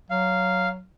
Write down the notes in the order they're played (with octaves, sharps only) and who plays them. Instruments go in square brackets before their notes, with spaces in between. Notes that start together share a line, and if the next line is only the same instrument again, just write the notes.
[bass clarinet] F#3 [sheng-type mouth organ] F5